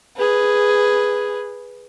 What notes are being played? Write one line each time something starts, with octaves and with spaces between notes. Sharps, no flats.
G#4 B4